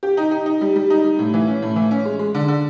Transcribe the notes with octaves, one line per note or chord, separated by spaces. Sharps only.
G4
D#4
D#4
D#4
G3
G3
D#4
G3
A2
E3
C#4
A2
E3
C#4
G#3
G#3
D3
D3